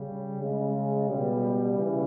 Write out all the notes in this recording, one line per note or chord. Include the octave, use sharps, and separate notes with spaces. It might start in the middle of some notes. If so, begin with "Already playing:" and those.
Already playing: C#3 G3
C#3 G#3
B2 G3
C#3 E3